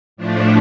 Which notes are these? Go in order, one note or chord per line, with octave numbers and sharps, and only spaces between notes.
A2 F3 A3 D4